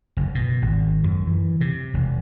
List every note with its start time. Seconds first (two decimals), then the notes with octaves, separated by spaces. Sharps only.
0.17 F#1
0.35 B2
0.62 G#1
1.03 F#2
1.27 E3
1.61 C3
1.94 E1